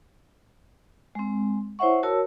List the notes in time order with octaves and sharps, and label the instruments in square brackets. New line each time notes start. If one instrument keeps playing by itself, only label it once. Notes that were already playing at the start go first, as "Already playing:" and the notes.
[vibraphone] G#3 C4
E4 C5 C#5 E5 F#5 C#6
F#4 A#4 C#5 A5 E6